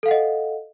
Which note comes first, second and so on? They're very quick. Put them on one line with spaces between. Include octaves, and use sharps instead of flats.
A4 F5 F#5 D#5